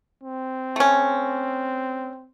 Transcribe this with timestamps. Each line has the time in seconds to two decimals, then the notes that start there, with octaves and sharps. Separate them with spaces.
0.24 C4
0.76 A3 C#4